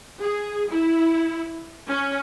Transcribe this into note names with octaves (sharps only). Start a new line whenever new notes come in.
G#4
E4
C#4